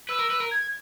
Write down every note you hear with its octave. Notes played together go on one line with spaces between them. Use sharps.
B4 E6
A#4
B4
A#4
G#6